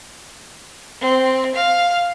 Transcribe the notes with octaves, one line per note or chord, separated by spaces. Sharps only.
C4
F5